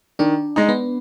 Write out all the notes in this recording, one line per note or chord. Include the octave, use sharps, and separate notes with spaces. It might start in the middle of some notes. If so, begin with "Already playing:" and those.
D#3 D4
G#3 D#4
B3